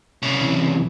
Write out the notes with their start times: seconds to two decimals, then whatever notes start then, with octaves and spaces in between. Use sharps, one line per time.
0.22 C2 C#3
0.41 C3 E3